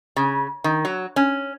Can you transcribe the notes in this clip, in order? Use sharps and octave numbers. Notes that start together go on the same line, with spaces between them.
C#3
D#3
F#3
C#4